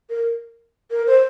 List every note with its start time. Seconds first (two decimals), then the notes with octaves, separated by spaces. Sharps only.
0.10 A#4
0.91 A#4
1.07 C5